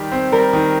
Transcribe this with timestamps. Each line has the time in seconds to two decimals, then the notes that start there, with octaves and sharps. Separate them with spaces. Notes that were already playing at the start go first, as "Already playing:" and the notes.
Already playing: D#3 G3 G4
0.12 C4
0.32 G3 A#4
0.53 D#3